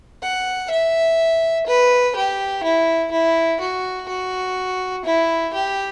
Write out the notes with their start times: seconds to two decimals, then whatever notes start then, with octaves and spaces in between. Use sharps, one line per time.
0.22 F#5
0.71 E5
1.67 B4
2.15 G4
2.64 E4
3.12 E4
3.60 F#4
4.09 F#4
5.05 E4
5.53 G4